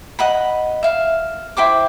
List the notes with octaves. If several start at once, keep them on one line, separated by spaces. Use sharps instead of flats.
D#5 F#5 B5
E5 F5
E4 C5 G5 D6